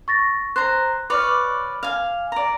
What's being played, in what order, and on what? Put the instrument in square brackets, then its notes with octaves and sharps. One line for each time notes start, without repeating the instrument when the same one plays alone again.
[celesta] C#6 A6 A#6
[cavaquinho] C5 A#5 [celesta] F#6
[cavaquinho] B4 C#5 D5 [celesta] D6 F6
[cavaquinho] F5 G#5
D5 A#5